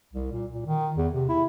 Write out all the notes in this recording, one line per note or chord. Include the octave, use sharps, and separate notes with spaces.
C2
A#2
A#2
D#3
E2
C3
E4